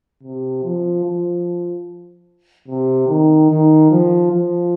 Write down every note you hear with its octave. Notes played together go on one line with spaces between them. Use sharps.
C3
F3
F3
C3
D#3
D#3
F3
F3